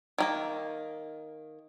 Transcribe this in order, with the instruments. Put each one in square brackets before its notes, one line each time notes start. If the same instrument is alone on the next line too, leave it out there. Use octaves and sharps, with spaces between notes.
[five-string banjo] D#3 G3 A#3